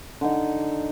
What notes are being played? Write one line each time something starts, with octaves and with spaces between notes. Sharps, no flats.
D3 D#4